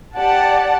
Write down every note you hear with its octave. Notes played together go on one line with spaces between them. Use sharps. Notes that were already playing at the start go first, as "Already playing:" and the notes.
G4 D5 F#5 A5